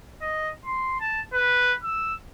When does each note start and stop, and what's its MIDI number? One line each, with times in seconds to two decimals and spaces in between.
0.21 0.50 75
0.65 0.99 84
1.00 1.21 81
1.33 1.74 71
1.83 2.15 88